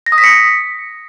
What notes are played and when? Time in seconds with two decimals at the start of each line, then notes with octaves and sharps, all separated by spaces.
0.06 A#6
0.12 D#6
0.18 B6
0.24 C#7